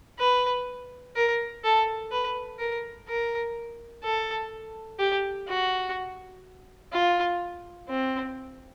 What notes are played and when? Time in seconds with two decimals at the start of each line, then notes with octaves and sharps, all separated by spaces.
0.19 B4
1.16 A#4
1.64 A4
2.12 B4
2.59 A#4
3.08 A#4
4.04 A4
4.99 G4
5.48 F#4
6.93 F4
7.89 C4